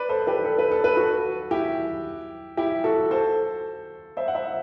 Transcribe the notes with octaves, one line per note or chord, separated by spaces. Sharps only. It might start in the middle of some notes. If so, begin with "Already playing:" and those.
Already playing: B4 D5
A4 C5
G4 B4
A4
B4
A4
B4
F#4 A4
E4 G4
E4 G4
F#4 A4
A4 C5
C5 E5
F#5
C5 E5